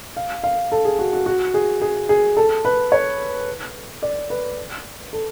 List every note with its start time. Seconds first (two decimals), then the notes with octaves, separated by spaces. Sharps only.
0.16 F5
0.43 F5
0.72 A4
0.85 G#4
0.99 F#4
1.13 F#4
1.26 F#4
1.54 G#4
1.81 G#4
2.09 G#4
2.37 A4
2.65 B4
2.92 C#5
4.02 D5
4.30 B4
5.13 A4